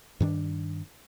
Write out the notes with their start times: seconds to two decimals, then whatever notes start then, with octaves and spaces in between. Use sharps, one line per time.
0.20 G2 D#3 D4